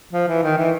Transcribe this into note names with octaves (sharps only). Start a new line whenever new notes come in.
F3
E3
D#3
E3